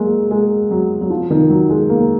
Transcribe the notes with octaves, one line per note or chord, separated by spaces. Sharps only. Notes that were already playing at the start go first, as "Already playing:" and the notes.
Already playing: F#3 G#3 A#3
G#3
F#3
F#3
F3
D#3
F#3
G#3
A#3